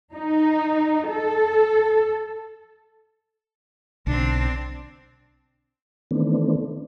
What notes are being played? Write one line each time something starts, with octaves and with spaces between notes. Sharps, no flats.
D#4
A4
B1 D3 C4 D4
D#3 E3 A3 B3 C4 D4